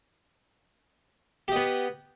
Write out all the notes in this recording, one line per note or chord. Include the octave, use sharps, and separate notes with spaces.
B3 G4 D#5